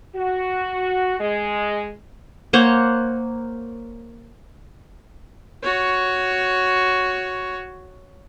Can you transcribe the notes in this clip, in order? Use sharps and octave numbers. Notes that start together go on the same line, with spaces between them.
F#4
G#3
A#3 C5 C#5 F#5
F#4 C#5